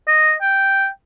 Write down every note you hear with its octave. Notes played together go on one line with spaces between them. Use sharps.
D#5
G5